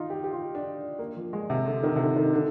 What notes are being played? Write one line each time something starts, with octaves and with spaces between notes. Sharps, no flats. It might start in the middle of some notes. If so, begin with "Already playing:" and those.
Already playing: D#4 F4
G4
G4
F4
D4
A#3
F3
G#3
C3
D3
D#3
C3
D3
D#3
D3